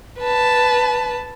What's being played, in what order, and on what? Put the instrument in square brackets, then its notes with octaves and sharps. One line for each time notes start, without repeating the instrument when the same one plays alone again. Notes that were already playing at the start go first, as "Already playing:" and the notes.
[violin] B4 A5